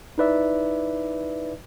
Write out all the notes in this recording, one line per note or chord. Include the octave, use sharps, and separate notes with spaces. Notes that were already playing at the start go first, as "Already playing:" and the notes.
D#4 E4 B4 D5 E5